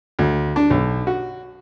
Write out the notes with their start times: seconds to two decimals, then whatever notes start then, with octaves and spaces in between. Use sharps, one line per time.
0.19 D2
0.56 D4
0.70 B1
1.07 F#4